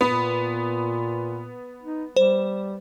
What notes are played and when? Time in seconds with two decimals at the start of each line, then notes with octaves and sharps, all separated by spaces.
0.01 A#2 B3
1.83 D#4
2.16 G3 C5